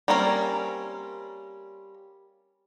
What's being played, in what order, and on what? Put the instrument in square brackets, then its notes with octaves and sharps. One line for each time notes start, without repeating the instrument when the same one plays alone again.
[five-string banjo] G3 A#3 C4 C#4 A#4